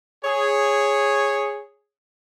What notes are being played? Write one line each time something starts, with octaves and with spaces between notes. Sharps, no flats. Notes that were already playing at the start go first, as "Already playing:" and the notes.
G#4 C#5